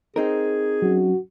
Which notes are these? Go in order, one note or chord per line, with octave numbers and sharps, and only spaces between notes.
C4 D#4 G#4 A#4
F#3 C#4 F#4